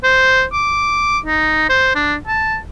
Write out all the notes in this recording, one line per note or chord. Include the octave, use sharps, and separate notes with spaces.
C5
D6
D#4
C5
D4
A5